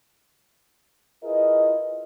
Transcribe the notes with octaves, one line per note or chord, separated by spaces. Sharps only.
E4 F4 G#4 A#4 B4 D#5